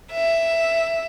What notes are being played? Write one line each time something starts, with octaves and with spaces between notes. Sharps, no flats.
E5